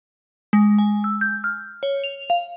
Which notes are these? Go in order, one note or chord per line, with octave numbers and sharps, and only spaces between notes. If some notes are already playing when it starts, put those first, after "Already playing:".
G#3
G#5
E6
G6
F6
C#5
F7
F5